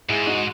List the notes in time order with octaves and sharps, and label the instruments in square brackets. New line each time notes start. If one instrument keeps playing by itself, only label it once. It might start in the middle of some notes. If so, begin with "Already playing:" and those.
[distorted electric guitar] G#2 [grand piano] E4 G#4
[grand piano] D#4 F#4